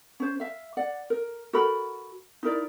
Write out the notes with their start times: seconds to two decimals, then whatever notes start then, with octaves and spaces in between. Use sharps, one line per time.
0.20 C#4 C5
0.40 E5 F5
0.77 D5 F#5
1.10 A#4
1.53 F#4 A4 A#4 B5
2.43 D#4 E4 A#4 D5